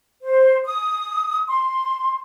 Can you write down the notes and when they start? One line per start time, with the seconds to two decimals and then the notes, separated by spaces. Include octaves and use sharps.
0.22 C5
0.65 D#6
1.47 C6